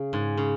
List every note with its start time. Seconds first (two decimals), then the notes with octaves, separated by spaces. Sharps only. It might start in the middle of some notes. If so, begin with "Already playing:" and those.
Already playing: C#3
0.13 G#2
0.37 C#3